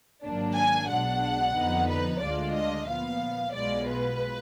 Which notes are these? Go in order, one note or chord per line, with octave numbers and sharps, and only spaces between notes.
G#1 G#2 F#3 A#3 D4
G#5
B1 B2 G#3 D4 F#5
F2 D3 F3 B3 D#4
B4
D2 D3 G#3 D4 F4 D5
D#5
A#2 F3 B3 F5
B1 B2 G#3 B3 F4 D5
B4